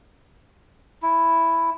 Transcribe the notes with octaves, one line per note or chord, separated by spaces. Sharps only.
E4